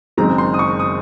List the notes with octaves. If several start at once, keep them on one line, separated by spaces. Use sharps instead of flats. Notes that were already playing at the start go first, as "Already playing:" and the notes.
F#1 F#2 D#3 G#3 C4 A#5
C6
D#6
C#6
D#6